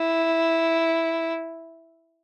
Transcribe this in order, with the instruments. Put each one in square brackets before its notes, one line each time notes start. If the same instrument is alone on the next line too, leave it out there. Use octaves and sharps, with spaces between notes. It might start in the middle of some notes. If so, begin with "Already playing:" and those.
Already playing: [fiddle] E4